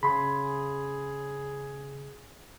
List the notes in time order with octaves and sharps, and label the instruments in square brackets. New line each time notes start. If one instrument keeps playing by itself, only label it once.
[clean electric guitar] C#3 [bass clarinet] G#4 [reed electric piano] B5 C6